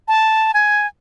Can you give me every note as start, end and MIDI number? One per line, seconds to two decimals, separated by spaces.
0.08 0.51 81
0.54 0.87 80